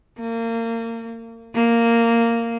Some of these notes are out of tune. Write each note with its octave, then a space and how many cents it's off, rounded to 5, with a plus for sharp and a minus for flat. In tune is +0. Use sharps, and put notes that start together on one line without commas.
A#3 -30
A#3 -10